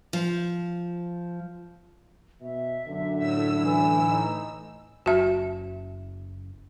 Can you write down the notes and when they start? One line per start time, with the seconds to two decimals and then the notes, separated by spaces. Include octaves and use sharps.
0.13 F3
2.41 B2 E5
2.87 F#2 D3
3.17 A2 E6
3.59 E3
4.05 D#4
5.06 F#1 F#4 E5